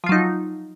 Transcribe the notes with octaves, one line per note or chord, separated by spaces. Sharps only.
F3 F#3 D#4 F4